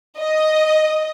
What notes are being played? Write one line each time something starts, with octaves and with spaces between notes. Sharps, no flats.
D#5